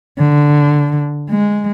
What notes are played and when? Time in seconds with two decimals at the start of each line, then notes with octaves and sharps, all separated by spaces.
0.19 D3
1.31 G#3